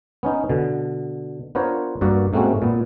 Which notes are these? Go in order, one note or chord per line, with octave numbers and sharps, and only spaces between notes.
B3 C#4 D#4
B2 D3
B3 D4 F4 A#4 C5 C#5
G2 A#3 F#4 D5 F#5
G#2 A3 A#3 C4 C#4 F#4
A#2 B3